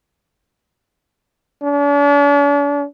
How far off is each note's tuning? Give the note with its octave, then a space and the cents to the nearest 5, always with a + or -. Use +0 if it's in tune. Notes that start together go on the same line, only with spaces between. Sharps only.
D4 -45